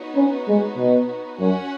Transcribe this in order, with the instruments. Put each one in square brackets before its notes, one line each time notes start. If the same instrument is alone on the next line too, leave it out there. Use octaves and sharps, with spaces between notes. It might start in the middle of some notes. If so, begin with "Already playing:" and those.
Already playing: [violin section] B3 D#4 F#4 C#5
[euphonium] C#4
G#3
B2
[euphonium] F#2 [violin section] C#4 F#4 C#5 F#5